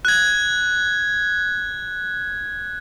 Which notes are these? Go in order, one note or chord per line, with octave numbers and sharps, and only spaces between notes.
F#6 G#6